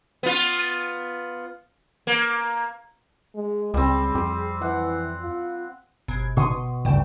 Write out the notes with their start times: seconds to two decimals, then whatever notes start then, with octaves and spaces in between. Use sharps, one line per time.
0.23 B3 F4
2.07 A#3
3.35 G#3
3.74 C#2 G3 C4 G#4
4.15 F2 G4
4.61 E3 F#5
5.22 F4
6.08 G1 B2 G#6
6.37 B2 D3 D#3 C6 C#6 D#6
6.51 B2
6.85 G#1 D2 G2 C#3 G5